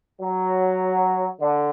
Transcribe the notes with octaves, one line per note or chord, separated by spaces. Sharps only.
F#3
D3